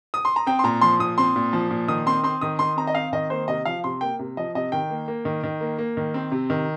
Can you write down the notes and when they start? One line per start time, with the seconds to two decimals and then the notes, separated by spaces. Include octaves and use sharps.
0.14 D#6
0.25 C6
0.36 A#5
0.47 C4 G5
0.59 C6
0.64 A#2 A#5
0.81 F3 C6
0.99 A#2 D#6
1.18 C4 C6
1.36 A#2
1.53 F3
1.71 A#2
1.88 D#3 D#6
2.06 C4 C6
2.23 C4 C6
2.41 D#3 D#6
2.59 D#3 C6
2.77 C4 A#5
2.87 D#5
2.95 C4 F5
3.13 D#3 D#5
3.30 A#3 C5
3.48 C3 D#5
3.65 F3 F5
3.84 C3 C6
4.01 A#3 G5
4.19 C3
4.37 F3 D#5
4.55 C3 D#5
4.72 D#3 G5
4.90 A#3
5.08 A#3
5.25 D#3
5.43 D#3
5.61 A#3
5.78 A#3
5.97 D#3
6.14 C4
6.32 C3
6.50 D#3